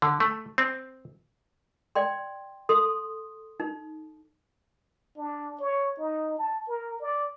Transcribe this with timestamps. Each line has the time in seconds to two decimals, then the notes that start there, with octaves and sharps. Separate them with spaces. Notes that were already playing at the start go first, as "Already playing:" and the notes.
0.02 D3
0.20 A3
0.58 C4
1.95 D5 G5 C6
2.69 A4 C6 D#6
3.60 D#4
5.18 D4
5.60 C#5
5.98 D#4
6.39 A5
6.69 A#4
7.01 D5